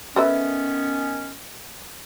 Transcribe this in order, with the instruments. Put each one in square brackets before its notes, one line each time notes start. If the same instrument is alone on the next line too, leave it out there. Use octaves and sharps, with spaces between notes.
[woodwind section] D#3 B3 C#4 [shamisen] A4 B4 E5